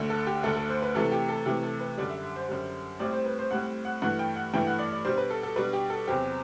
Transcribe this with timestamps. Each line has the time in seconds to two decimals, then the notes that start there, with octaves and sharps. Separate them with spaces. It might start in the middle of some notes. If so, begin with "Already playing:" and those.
Already playing: D2 D3 A3
0.10 A4
0.27 G4
0.43 D2 D3 A3 A4
0.56 A4
0.69 C5
0.82 B4
0.95 C3 E3 A3 A4
1.12 G4
1.29 A4
1.46 C3 E3 A3 G4
1.63 A4
1.80 B4
1.97 F#2 D3 G3 D5
2.10 E5
2.23 E5
2.36 C5
2.49 F#2 D3 G3
3.00 A2 G3 C4 D5
3.13 C5
3.26 B4
3.39 C5
3.51 A2 G3 C4 F#5
3.85 F#5
4.02 G2 E3 A3 F#5
4.19 G5
4.36 F#5
4.54 G2 E3 A3 G5
4.67 F#5
4.79 D5
4.92 D5
5.05 B2 G3 D4 C5
5.17 B4
5.30 A4
5.43 A4
5.56 B2 G3 D4 B4
5.73 G4
5.90 A4
6.07 E2 C3 F#3 C4 G4